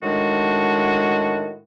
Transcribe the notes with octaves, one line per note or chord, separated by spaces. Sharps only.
A2 D#3 G#3 D4 F#4